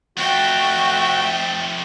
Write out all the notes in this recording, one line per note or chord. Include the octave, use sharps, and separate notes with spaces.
F2 A3 F#4 E5 G5